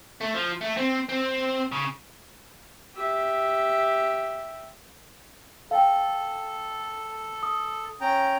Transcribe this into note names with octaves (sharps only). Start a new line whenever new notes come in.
A3
F3
A3
C4
C4
C#3
G4 E5
A4 F5 G5
D#6
C#4 G5 A#5